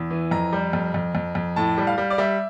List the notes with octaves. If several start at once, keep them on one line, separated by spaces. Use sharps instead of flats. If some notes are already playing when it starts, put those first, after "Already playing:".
Already playing: E2
E3
F2 A#5
G3
F2
F2
F2
F2
A2 A5
G3
F5
G3
D5
G3 E5